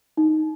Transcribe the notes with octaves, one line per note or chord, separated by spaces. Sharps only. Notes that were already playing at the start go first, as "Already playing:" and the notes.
D#4